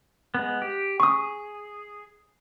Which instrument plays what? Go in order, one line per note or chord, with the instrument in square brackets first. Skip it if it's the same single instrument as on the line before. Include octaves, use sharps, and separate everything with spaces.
[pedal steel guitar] G#3 B3
G4
[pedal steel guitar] G#4 [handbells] C#6 D#6